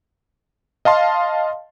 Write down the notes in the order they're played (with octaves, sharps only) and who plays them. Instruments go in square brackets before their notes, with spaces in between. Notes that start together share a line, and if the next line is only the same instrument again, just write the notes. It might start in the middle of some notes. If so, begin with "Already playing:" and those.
[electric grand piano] D#5 F5 A5 C6